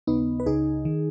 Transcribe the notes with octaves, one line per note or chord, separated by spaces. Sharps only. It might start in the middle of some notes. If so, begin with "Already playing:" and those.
D#2 C#3 B3 D#4
B4
C#2 C#3 D#4 G#4
D#3